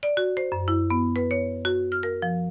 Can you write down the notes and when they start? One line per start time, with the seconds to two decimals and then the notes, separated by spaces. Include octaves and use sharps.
0.03 D5
0.17 F#4
0.37 C5
0.52 F#2
0.68 E4
0.90 B3
1.16 B4
1.31 C#5
1.65 F#4
1.92 F6
2.03 A#4
2.22 F3